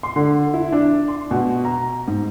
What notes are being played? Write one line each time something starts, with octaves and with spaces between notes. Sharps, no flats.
C6
D3
E4
D4
C6
B2
A#5
G#2